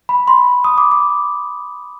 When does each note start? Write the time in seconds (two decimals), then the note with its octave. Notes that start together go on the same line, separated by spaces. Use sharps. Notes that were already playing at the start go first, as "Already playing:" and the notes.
0.09 B5
0.28 C6
0.64 D#6
0.78 D6
0.91 D6